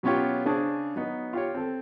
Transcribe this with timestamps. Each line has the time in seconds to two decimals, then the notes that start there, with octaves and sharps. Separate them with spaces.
0.03 B2 F#3 B3 C#4 F4 G4
0.45 C#3 C#4 D4 G#4 C5
0.96 F#3 B3 D#4
1.33 F4 G4 C#5
1.55 C4 A4